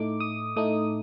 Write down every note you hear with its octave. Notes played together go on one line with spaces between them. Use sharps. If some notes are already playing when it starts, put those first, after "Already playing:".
Already playing: A2 A3 D#4 D6
D#6
A2 A3 D#4 D#6